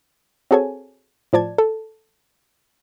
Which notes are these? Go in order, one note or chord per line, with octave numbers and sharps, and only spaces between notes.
C4 F#4 G#4 A4 C#5 G#5
A2 F3 D5 A5 G#6
A4